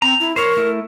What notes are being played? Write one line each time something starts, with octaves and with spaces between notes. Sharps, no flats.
C4 A#5
E4
A#4 C5 C#5
A3 E4